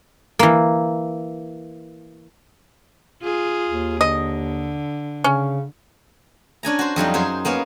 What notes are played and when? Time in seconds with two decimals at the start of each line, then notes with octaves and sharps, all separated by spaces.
0.39 E3 A#3
3.22 F4 G#4
3.69 D#2
4.01 D3 D#5
5.24 C#3 C#4
6.63 C#4 D4 G#5 A#5
6.79 F#4 C5
6.96 F2 F#3 G3 D#4
7.14 F#2 G#4 C5
7.45 A#3 B3 C#4 F5